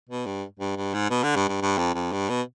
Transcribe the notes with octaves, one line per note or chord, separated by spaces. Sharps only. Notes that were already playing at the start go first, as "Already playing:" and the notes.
B2
G2
G2
G2
G#2
B2
D3
G2
G2
G2
F2
F2
G2
B2